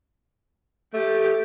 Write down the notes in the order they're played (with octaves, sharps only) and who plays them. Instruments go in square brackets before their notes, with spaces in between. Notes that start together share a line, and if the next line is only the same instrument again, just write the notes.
[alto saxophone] A3 [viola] G4